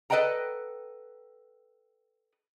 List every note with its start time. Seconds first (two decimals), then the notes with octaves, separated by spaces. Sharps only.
0.10 A4 B4 D#5 F#5 G5 A#5